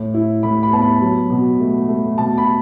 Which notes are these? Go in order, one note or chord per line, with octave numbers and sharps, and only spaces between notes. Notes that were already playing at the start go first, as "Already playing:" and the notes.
Already playing: A2
E4
A2 B5
B5
B3 A5
B5
F#3
B2
A3
A3
B2 A5
B5